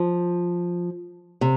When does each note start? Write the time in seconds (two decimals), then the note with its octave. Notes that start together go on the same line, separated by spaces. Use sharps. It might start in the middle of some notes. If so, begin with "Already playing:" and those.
Already playing: F3
1.41 C3